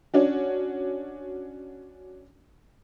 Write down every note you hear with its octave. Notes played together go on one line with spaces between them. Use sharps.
C#4 D4 F#4